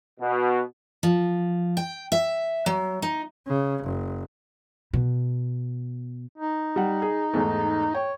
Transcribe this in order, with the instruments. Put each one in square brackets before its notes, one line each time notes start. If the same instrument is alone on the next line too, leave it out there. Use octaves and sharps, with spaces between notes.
[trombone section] B2
[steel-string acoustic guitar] F3
G5
E5
F#3
D#4
[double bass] C#3
F#1
[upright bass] B2
[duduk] D#4
[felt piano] G3 F#5
G#4
E2 G#2 A3
[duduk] C#5 [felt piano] G5